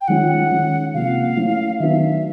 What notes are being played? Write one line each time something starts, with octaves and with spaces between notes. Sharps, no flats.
G5
D#3 G#3 C#4 F4 F#5
D#3 G#3 C#4
C3 F3 A#3 F5
E3 A3 C#4 E4
D#3 F#3 B3 D4 E5